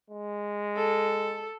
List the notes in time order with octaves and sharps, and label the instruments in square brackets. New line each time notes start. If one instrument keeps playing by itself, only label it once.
[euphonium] G#3
[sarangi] A4